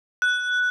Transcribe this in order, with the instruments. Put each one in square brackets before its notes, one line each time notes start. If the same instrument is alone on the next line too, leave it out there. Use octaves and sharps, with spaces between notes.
[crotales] F#6